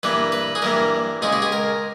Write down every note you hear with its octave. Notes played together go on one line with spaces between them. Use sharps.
G2 E3 G3 A#3 B4
B4
G#4
G2 E3 G3 A#3 A#4
C#2 C#3 G#3 G#4
G4
G#4
A#4